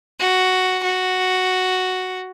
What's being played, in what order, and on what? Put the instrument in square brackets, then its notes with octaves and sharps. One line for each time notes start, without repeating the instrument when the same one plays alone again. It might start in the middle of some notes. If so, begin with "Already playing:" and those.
[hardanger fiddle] F#4
F#4